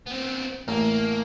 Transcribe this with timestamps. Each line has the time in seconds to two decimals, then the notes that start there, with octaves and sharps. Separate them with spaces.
0.07 B3 C4
0.68 A1 A#3